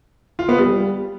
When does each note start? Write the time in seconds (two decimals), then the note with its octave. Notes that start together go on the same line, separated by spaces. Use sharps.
0.39 F4
0.49 B3
0.58 G3